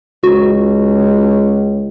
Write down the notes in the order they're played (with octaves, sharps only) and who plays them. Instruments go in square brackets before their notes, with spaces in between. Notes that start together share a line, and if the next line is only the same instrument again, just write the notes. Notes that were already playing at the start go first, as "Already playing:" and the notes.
[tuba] C#2 [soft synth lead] F#4